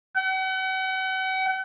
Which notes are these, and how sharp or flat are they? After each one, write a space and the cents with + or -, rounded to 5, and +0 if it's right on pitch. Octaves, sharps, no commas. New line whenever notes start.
F#5 +40